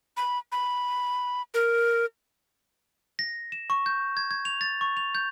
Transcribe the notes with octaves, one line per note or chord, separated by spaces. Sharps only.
B5
B5
A#4
A#6
E7
C#6
G6
G#6
G#6
F7
A6
C#6
F7
G6